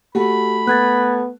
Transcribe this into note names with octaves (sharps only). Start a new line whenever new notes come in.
A3 F#4 G4 B5
A3 B3 F#6 G#6 A6